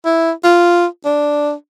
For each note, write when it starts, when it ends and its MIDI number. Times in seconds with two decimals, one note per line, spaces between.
0.05 0.31 64
0.44 0.86 65
1.05 1.53 62